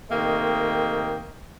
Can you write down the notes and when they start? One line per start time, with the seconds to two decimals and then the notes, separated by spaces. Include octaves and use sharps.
0.10 C3 D#3 A3 A#3 D#5 G5